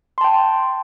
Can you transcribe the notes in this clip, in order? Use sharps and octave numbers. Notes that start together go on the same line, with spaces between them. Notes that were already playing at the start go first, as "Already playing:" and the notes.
G5 A5 C6